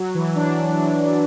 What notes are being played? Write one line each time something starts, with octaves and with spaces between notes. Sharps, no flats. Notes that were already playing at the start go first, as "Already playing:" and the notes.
Already playing: F#3
E3
D4